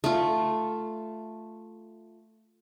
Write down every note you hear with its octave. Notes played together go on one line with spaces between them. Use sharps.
A3 F4